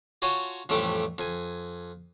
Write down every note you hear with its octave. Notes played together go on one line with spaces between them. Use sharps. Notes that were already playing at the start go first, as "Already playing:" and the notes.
F4 F#4 C#5 G#5 A5 C6
A1 F2 G3 A3 G4
F2 G#5